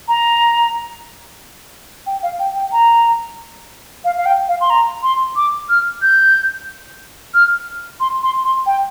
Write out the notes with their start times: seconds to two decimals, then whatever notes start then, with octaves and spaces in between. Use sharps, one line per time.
0.08 A#5
2.06 G5
2.23 F5
2.39 G5
2.56 G5
2.72 A#5
4.05 F5
4.17 F5
4.26 G5
4.49 F5
4.61 C6
4.70 A#5
5.03 C6
5.36 D6
5.69 F6
6.02 G6
7.34 F6
8.00 C6
8.23 C6
8.44 C6
8.66 G5